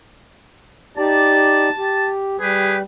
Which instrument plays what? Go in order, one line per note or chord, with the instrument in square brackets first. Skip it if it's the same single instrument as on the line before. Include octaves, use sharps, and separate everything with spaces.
[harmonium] D#4 G4 D5 [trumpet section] A5
[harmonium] G4
[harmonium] G3 [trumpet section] G4 G#4 B4